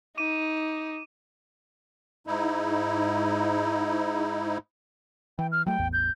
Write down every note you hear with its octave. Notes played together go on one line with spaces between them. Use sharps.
D#4 D6 D#7
G#2 D#4 E4
E3 G5
F6
F#3 A3 G5
A1 E2
G6